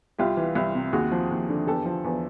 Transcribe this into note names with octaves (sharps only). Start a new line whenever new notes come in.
C2 F4 G4
E3
C2
C3
D#2 F#4 G#4
F3
D#2
D3
E2 G4 A4
F3
E2